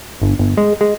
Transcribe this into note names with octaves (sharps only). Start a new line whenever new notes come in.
G1
G1
G#3
G#3